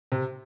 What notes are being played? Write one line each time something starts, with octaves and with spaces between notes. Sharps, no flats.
C3